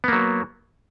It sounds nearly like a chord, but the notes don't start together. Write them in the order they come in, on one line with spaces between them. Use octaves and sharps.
B3 A#3 F#3